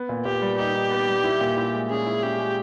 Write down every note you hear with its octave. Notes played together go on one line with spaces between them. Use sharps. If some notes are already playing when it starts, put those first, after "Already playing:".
Already playing: B3
A#2
A#2 G4
G3
D#4 G4
D#4
B3
G3
E4
A#2
E4
G#3
C#4 G#4
E4
C#4 G4
G#3